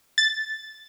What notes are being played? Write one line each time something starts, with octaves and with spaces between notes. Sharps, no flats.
A6